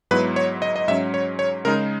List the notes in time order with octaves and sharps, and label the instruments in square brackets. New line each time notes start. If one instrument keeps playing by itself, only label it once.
[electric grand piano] G#2 F#3 B3 E4 B4
C#5
D#5
D#5
G#2 F#3 C#4 E5
C#5
C#5
C#3 G#3 D#4 A#4